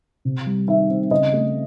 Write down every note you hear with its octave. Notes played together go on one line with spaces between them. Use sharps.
C3
G3
D#3 E5
C4
C#3 D#5
A3